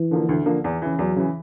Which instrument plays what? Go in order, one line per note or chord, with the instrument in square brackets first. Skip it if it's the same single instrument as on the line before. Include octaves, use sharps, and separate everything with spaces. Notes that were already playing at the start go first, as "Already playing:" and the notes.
Already playing: [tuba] E3
[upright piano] D3 F3 A#3
D2
D3 F3 A#3
E2
C#3 E3
[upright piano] E2 [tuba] F#3
[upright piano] C#3 E3